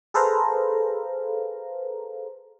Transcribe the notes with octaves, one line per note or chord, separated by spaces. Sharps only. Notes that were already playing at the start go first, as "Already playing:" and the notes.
G#4 A4 B4 C5 F5 A#5